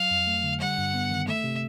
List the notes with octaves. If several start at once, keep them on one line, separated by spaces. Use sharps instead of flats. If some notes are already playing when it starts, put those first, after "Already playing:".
Already playing: F#3 F5
F2
A3
D3
G3 F#5
G2
B3
D#3
A3 E5
C3